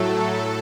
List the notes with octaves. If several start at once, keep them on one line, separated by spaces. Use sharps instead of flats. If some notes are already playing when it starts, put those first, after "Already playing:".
Already playing: A2 F#3 A3 A4